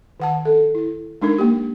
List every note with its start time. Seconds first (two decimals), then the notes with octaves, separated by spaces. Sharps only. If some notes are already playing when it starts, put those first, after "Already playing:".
0.20 D#3 F#5 A5
0.45 A4
0.75 E4
1.22 G#3 D4 D#4 A#4
1.39 A#3 G4